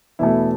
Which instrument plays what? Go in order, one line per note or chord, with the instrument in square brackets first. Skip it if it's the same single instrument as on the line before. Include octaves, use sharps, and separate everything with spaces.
[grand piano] E2 B2 A3 E4